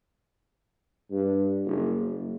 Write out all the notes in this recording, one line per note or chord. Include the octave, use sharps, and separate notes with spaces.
G2
F#1
F#1